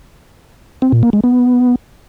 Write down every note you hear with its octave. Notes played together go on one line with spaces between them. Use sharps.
C4
A#2
A#3
G#3
B3